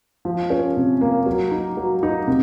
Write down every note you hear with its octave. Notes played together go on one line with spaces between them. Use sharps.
F3
C#4
C3
A#3
F#3
D#4
F#3
D#4
C3